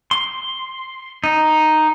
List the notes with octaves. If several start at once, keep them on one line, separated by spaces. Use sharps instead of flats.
C6
D#4